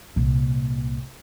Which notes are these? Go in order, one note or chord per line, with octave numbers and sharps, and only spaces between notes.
C2 A#2